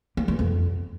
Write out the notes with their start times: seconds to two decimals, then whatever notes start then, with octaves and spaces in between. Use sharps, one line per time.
0.17 A#3
0.28 E3
0.39 F2